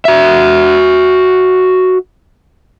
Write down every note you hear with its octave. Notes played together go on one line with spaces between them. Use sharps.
F#4 E5